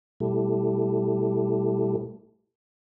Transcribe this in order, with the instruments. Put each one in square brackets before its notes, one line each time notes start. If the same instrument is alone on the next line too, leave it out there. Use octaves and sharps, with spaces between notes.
[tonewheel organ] B2 G3 A3 E4 G4 A4